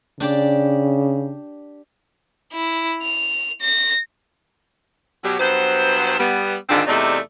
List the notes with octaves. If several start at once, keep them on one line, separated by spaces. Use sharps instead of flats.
C#3 D4 G4 D5
E4
F7
A#6
B2 F#3 G4
G2 F#3 B3 C5
G3 B3
G#2 D3 D#3 C4 D4 F4
E2 C3 A3 D#4 D5